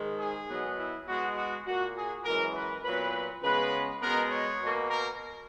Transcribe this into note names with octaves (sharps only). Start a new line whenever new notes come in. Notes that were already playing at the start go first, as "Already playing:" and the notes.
Already playing: G#2 D#3 G#3
G#4
B2 F#3 B3
E4
B2 G#3 B3 F#4
F#4
A#2 A#3 F#4
G#4
F#2 E3 G#3 A#4
B4
A#2 F#3 B3 B4
C#3 G#3 B3 B4
B2 G#3 B3 A#4
C#5
B2 A#3
A#4